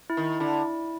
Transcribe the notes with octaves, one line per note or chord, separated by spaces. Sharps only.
E4
D#3
D3 E4